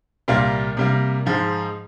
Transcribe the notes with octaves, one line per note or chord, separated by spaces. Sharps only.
C2 A#2 G3 A#3 F4
C3 G3 A#3
G#2 F3 G#3